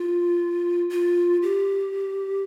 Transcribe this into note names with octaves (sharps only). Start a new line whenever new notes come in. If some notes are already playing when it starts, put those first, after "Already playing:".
Already playing: F4
F4
G4